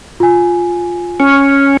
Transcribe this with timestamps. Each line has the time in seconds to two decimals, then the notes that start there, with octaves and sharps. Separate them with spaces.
0.20 F4 G#5
1.20 C#4